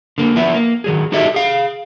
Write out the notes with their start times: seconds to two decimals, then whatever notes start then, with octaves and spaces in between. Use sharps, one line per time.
0.18 D3 A#3
0.36 F3 B3 E4
0.54 A#3
0.84 D#3 F#3 G#4
1.12 D#4 F#4 G4 A4 D#5 E5
1.34 G#4 F5